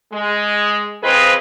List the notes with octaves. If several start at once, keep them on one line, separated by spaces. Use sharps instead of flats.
G#3
C#3 F3 C4 G#4 B4 D#5